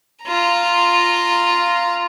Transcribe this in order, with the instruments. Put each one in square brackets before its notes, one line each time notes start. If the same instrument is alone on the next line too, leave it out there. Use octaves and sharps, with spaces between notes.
[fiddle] F4 A#5